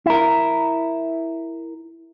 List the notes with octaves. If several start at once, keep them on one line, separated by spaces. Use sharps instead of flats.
E4 A#4